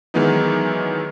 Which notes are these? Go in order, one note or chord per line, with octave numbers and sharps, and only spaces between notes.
D#3 E3 F#3 G#3 B3 D#4